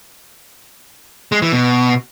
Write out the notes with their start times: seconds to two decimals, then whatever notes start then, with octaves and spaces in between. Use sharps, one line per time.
1.32 G#3
1.42 E3
1.52 B2